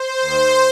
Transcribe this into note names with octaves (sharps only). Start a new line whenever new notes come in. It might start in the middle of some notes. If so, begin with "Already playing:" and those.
Already playing: C5
D#2 D#3